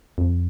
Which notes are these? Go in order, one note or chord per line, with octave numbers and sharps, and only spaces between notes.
F2